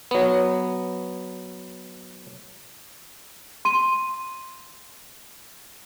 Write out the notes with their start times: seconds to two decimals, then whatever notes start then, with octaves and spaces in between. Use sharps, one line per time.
0.11 F#3 B3
3.65 C6 D#7